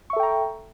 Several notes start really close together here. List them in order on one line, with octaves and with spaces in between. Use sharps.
C#6 E5 A4 G5 A#5